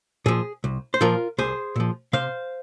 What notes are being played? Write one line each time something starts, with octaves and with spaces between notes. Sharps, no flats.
A#2 F3 G#4
C2
C5
A#2 F3 F4 A#4
C2 G#4 C5
A#2 F3
C3 C5 F5